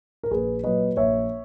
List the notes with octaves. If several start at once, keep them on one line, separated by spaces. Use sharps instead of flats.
A#4
A#1 G#4 B4
A#2 F#3 B4 D#5
A#1 C#5 E5